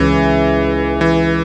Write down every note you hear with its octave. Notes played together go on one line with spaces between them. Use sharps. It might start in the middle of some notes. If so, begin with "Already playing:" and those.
Already playing: C#2 C#3 E3 G#3 C#4 E4
E3